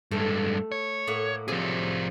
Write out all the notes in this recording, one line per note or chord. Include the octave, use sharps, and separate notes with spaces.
G2 G#3 A3
C#5
A2 A#3 F#5
C3 F3 F#3 F4 G#4